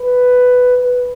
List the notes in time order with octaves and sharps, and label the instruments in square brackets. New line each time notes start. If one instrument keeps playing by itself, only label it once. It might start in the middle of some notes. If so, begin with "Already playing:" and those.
Already playing: [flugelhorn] B4
B4